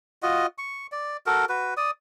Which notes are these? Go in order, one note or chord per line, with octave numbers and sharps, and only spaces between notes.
F4 F#4 D#5
C#6
D5
F#4 A4 A#4
F#4 B4
D5 D#6